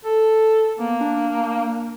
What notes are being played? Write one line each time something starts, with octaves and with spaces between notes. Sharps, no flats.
A4
A#3 B3
D4